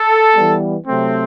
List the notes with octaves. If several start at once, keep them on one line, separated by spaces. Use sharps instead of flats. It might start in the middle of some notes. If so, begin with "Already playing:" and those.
Already playing: A4
E3 G3 B3
C3 F#3 A3 C4